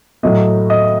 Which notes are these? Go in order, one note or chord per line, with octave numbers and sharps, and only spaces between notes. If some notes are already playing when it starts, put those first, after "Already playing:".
A2 F#3 A3 D#5
D#5